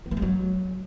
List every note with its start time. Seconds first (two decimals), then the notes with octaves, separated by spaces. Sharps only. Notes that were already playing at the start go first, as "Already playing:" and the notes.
0.06 B3
0.11 A#3
0.17 G#3
0.22 F#3